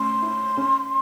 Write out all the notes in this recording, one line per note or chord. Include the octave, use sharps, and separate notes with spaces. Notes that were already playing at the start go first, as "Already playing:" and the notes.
Already playing: A3 C#4 C6
E4
C#4